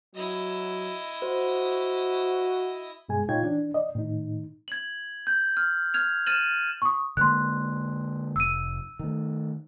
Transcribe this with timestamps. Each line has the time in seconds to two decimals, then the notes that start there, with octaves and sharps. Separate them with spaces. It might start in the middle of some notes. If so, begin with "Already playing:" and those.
0.15 F#3 E4 D#5
1.22 F#4 C5
3.09 G2 B2 G#3 G#4 G#5
3.29 A#2 D#4 F4 C#5 G5 G#6
3.43 E3 D4
3.74 D5 D#5
3.95 A2 D#3 D#4
4.68 G#6 F#7
5.27 G6
5.57 F6
5.94 F6 G#6 F7
6.27 F6 A6 D#7 E7 F#7
6.82 C#6 D#6
7.17 D3 G#3 A#3 C6 F#6
8.36 F1 E6 D#7
8.99 D#3 A3